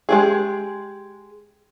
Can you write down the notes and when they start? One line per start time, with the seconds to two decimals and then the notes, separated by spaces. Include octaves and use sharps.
0.09 G#3 G4 G#4